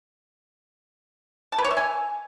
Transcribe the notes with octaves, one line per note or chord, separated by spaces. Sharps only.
A5
B4
C#5
E5
G#5